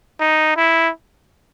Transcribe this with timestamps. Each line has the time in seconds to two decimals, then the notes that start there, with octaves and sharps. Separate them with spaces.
0.20 D#4
0.56 E4